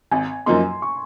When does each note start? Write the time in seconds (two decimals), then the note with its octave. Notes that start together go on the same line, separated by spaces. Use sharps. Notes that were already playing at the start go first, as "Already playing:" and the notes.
0.11 G#1 G#5
0.46 F#2 F3 A#3 D#4 C6
0.82 C#6